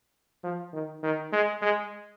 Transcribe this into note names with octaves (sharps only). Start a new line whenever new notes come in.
F3
D#3
D#3
G#3
G#3